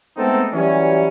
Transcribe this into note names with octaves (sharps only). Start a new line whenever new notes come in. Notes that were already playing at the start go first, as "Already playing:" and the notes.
G#3 A3 B3 C4 D#4 A4
E3 F#3 G3 C#4